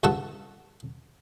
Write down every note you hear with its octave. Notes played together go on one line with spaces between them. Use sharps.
C#2 G2 A4 F#5 A5 C#6